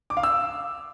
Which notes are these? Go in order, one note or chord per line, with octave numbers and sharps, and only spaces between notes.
D6
F5
E6